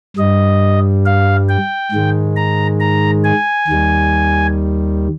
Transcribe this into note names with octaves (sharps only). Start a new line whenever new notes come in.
G2 G3 D#5
F5
G5
G#2 D#3 G#3
A#5
A#5
G#5
D#2 D#3 G3